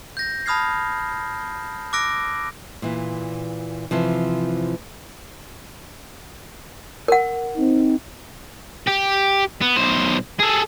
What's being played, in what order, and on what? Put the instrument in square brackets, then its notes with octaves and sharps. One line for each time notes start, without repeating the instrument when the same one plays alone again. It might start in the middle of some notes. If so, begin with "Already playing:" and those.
[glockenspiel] G6 A#6
A5 B5 D#6 F6 G#6 C7
D6 E6 F#6 A#6 D7
[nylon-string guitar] A#2 E3
C3 E3 F3
[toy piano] A#4 F#5
[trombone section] C4 D#4
[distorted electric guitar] G4
B3
B1 C5
G#4 A4